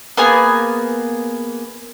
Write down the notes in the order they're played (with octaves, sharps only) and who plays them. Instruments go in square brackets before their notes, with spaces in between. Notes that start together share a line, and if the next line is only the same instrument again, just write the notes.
[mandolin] A#3 B3 G#4 G#5